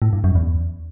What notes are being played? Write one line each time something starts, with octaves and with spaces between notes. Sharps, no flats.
A2
G2
F#2
E2